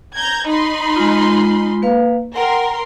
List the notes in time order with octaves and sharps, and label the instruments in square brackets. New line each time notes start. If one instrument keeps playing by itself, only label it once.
[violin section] A#5 G6 G#6
D#4 B5 C6
[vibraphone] G#3 F4
A#3 B4 F5
[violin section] A#4 C6 [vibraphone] F#5 G5